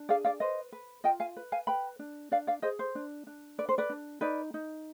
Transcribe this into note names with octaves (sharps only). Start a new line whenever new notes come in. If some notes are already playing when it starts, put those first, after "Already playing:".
Already playing: D4
G#4 D5 F5
D5 F5
B4 C5 D#5
B4
F4 D#5 G5
F5 G#5
B4
F5 G#5
B4 G5 B5
D4
D4 D5 F5
D5 F5
G#4 C5 D#5
C5
D4
D4
B4 D5
C5
B4 D5
D4
D#4 B4 D5
D#4